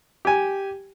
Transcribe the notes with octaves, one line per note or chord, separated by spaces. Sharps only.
G4 G#5